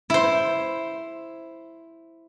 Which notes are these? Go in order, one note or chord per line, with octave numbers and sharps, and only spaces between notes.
E4 C5